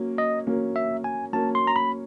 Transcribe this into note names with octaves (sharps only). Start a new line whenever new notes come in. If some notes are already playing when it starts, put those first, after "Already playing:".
Already playing: F#3 A#3 C#4
D#5
F#3 A#3 C#4
E5
G#5
F#3 A#3 C#4 A5
C6
A#5
B5